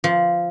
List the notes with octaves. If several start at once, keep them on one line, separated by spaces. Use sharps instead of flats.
F3